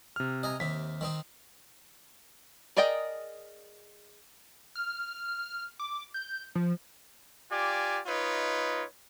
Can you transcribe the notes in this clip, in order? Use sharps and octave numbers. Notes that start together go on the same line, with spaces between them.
C3 F6
D#5 G#5 A#5
D#2 C3 B6
D#3 C4 D#4
G#4 A#4 D5 D#5 G5
F6
D6
G6
F3
F4 G4 D5 G#5 D6
D#4 F4 B4 C#5 D#5